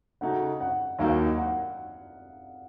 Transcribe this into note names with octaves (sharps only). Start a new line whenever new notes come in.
C#3 A3 D#4 F#4 F#5
F#5
D#2 D#3 F#3 A#3 D#4 F5
F#5